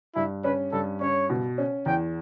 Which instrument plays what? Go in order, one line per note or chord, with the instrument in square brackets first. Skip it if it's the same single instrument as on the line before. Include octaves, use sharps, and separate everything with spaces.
[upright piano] G2 [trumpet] E4
[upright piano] C#4 [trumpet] B4
[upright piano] G2 [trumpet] A4
[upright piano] C#4 [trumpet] C#5
[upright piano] B2
C#4
[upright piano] E2 [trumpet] G5